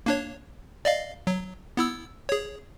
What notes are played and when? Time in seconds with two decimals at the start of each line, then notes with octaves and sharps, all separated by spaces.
0.06 A#3 D4 C#5
0.85 D5 D#5 F5
1.27 F#3
1.77 B3 E4 E6
2.29 G#4 C#5